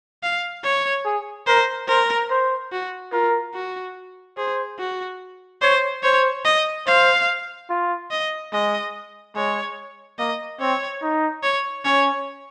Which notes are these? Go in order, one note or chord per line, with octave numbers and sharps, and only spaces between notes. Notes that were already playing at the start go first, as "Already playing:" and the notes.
F5
C#5
G#4
A#4 C5
A#4 C5
C5
F#4
F4 A#4
F#4
G#4 C5
F#4
C5 C#5
C5 C#5
D#5
C5 F5
F4
D#5
G#3 D#5
G#3 C#5
A#3 D#5
C4 C#5
D#4
C#5
C#4 C#5